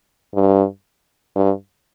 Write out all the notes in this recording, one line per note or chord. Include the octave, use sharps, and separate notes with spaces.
G2
G2